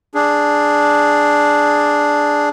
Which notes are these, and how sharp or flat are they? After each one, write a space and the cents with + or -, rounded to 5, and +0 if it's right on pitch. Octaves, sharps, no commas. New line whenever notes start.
D4 +0 G#4 +0